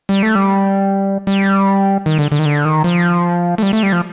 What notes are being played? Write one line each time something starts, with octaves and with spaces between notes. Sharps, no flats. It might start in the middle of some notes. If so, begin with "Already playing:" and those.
G3
A3
G3
G3
D#3
D3
D3
D#3
D3
D#3
F3
A3
G3
A3
G3
F3